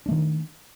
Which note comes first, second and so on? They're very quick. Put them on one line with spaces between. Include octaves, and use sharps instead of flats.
D4 A3 D#3